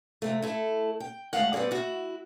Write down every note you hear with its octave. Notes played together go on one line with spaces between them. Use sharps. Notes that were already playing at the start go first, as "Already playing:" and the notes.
F2 C3 A3
A3 E4 A4
G5
D2 F#3 G#3 A3 F5 F#5
G3 B3 C4 G#4 D5
E4 F#4